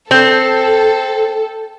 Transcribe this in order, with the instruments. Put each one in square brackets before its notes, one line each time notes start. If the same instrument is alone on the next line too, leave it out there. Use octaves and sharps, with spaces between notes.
[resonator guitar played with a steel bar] C4 [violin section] A4